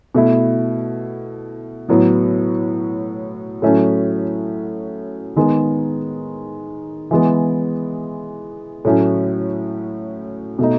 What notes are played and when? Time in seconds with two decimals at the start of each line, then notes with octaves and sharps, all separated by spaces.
0.15 B2 A3 E4
1.89 A2 F#3 B3
3.62 A2 F#3 A3 C#4
5.36 D#3 G#3 B3
7.11 E3 G#3 B3
8.85 A2 F#3 A3 C#4
10.59 B2 A3 D#4